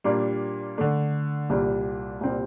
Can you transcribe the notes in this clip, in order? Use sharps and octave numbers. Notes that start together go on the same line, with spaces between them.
A#2 G3 A#3 D4
D3 A3 D4
C2 A#2 G3
C2 A#2 G3 C4